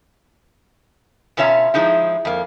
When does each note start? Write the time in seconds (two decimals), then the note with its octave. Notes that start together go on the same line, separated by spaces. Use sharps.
1.37 B2 C#4 F4 C#5 E5 A#5
1.74 F3 G#3 D#4 E4
2.25 F2 A#3